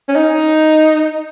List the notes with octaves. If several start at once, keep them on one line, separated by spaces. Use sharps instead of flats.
C#4
D#4